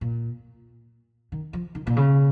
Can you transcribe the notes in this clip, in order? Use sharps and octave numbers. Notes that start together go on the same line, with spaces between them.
A#2
D#3
F3
D#3
A#2
C#3